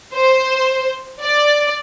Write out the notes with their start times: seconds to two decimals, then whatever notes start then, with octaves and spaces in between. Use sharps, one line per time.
0.14 C5
1.21 D5